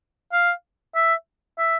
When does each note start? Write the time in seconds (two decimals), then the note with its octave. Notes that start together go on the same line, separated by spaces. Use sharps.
0.32 F5
0.95 E5
1.58 E5